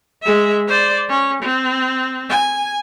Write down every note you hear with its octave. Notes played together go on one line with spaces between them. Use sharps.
G#3 E5
C5 D5
C#4
C4
G#5